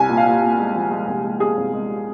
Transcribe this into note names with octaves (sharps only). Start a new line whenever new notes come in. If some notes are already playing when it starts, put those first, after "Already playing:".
Already playing: C2 G#5
A#2
F5
A#2
A#2
G#3
F3
G#3
C2
G#3
G#3 G#4
C2
G#3